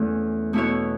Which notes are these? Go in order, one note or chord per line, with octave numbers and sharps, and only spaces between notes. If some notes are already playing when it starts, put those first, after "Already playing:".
Already playing: E2 E3 A3 C#4
B2 A3 E4 C#5